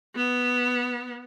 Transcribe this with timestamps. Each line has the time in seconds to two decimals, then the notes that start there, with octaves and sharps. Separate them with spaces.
0.15 B3